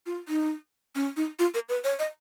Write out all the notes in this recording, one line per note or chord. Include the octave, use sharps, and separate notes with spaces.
F4
D#4
C#4
D#4
F4
A#4
B4
C#5
D#5